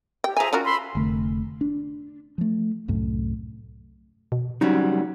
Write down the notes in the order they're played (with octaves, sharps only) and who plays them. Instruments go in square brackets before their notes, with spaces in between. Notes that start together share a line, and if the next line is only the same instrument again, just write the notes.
[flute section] G4 [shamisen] G5
[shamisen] F3 G#5 [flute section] G#4 E5 A#5
[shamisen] C#4 F4 A#4 [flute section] F#4
[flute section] B5 C6 E6
[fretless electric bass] F1 F2 D3 A3
D4
F3 A3
C2 F#2 A2
[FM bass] B2
[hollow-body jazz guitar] C#3 F#3 G3 [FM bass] D#4